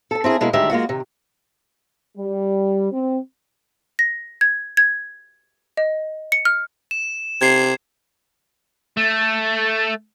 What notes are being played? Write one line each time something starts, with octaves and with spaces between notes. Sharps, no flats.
A4 A5
C4 E4 G#4 A#4
B2 G#3 A#3 E4 A#4
D2 D#3 G3 G#3 G4 E5
G#3 A#3 F4 F#4
C3 D#3
G3
C4
A#6
G#6
G#6
D#5
C#7
F6
E7
C3 G#6 C7
A3